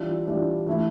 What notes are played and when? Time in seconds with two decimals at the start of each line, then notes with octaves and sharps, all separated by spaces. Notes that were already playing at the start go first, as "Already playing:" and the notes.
Already playing: E3 G3 D4 F4
0.27 E3 G3 D4 F4
0.67 E3 A3 E4